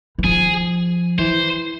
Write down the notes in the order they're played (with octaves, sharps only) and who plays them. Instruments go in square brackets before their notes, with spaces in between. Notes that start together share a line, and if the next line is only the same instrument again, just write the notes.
[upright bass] E3
[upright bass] F3 [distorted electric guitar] G#4
[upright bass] E3 [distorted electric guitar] C5